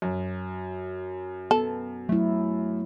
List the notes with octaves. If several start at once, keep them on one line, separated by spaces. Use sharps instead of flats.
F#2
B3 A4
F#3 A3 E4